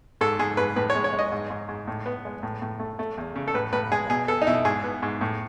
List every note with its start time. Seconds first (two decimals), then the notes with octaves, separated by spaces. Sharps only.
0.21 G#2 A4
0.39 G#2 G#4
0.57 G#2 B4
0.76 A2 B4
0.90 C#5
0.95 G#3
1.04 C#5
1.13 G#3
1.19 D#5
1.32 G#2
1.50 G#2
1.69 G#2
1.87 A2
2.06 B3
2.25 G#3
2.43 A2
2.62 A2
2.80 A3
2.99 A3
3.18 E2
3.36 C#3
3.48 A4
3.54 A2 B4
3.73 A2 B4
3.92 G#3 G#4
4.10 B2 G#4
4.28 B3 A4
4.42 D#4
4.47 B2 E4
4.65 G#2 G#4
4.84 B3
5.02 G#2
5.21 A2